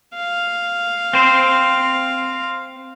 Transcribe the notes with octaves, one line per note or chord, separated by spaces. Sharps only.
F5
C4 C5